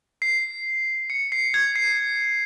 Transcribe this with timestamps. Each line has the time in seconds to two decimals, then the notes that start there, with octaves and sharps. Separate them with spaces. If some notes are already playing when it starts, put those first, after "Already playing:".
0.22 C7
1.10 C#7
1.32 C7
1.54 G#6
1.76 C7